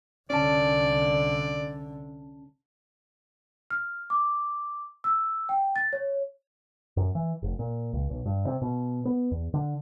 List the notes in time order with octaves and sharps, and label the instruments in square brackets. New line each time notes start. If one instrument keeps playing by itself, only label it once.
[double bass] C2 D3 [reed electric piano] C#4 A5 [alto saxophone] D5
[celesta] F6
D6
E6
G5
A6
C#5
[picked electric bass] F#2
E3
F1
A#2
C#2
B1
G2
C3
B2
B3
E2
D3